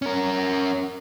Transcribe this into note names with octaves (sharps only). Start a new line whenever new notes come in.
C#4 A#4